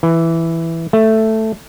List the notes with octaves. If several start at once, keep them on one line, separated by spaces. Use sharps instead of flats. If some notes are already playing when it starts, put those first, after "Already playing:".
E3
A3